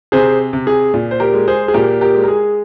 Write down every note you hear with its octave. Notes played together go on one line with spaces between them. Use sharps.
C3 G#4 C5
C3
G#4
A#2
C5
G4 A#4
G#3
G#4 C5
G#4
A#2 G4 A#4
G4 A#4
G#3
A#4
G#4